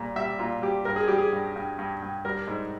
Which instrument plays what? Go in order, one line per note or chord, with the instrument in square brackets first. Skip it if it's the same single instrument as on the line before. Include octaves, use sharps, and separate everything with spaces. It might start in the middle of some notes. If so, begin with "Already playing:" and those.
Already playing: [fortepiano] A#2 G3 A#3
G3 E5
A#2 F4
G3 G4
G2 A#4
G#4
G3 G4
G#4
G2
G2
G2
G2
G3 A#4
G#2